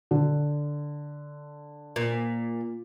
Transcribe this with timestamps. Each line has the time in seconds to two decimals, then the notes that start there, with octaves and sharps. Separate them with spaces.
0.11 D3
1.96 A#2